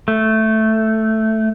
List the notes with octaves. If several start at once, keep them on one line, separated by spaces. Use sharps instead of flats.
A3